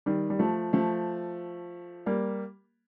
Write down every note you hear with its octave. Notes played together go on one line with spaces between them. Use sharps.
D#3 G3
G3
F3 A3
F3 A3
G3 A#3